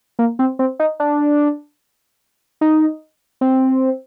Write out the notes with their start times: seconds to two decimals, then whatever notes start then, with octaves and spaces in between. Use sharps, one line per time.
0.19 A#3
0.39 C4
0.59 C4
0.80 D#4
1.00 D4
2.61 D#4
3.41 C4